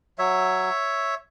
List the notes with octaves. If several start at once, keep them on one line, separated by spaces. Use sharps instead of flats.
F#3 C#5 E5